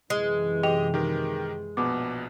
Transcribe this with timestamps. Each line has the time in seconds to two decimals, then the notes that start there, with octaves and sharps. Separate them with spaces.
0.10 F#2 C3 E3 G#3
0.63 G4 G#4 D#5 G5 F7
0.94 D#3 G4 A#4
1.77 A#1 B2 B3 D6